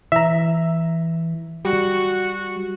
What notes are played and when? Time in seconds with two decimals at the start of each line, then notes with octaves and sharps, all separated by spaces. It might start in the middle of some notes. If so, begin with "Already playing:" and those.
0.12 E3 E5 A#5
1.65 G3 F#4